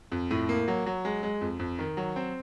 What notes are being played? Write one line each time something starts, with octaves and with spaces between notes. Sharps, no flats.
F2
A2
A#3
F#3
F#3
G#3
G#3
F2
F2
D#3
F#3
C4